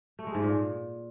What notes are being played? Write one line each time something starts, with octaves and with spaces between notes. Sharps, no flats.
A3
G#3
G#2
A#2